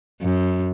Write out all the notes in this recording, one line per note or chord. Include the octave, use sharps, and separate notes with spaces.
F#2